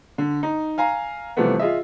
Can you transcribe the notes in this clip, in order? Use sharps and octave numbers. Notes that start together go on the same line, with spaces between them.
D3
D#4
F5 G#5 A#5
C3 E3 F3 G3 A3 B3
F4 G#4 D#5 E5